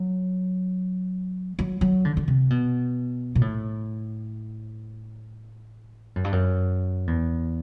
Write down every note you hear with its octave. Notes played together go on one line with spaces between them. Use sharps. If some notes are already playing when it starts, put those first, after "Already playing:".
Already playing: F#3
F#3
F#3
D3
D3
C3
B2
B2
A2
F#2
G2
F#2
E2